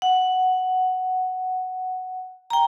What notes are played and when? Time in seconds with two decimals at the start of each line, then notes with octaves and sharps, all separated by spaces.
0.02 F#5
2.50 G5 A#5